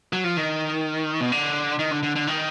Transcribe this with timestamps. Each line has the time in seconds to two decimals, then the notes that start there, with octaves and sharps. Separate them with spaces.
0.13 F#3
0.24 F3
0.37 D#3
1.20 B2
1.32 D3
1.79 D#3
1.91 D3
2.03 D3
2.16 D3
2.27 D#3